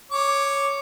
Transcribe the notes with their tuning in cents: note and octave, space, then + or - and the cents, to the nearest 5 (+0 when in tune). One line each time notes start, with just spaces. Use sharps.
C#5 +0 D6 +0